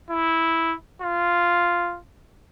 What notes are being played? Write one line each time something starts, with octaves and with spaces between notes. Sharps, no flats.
E4
F4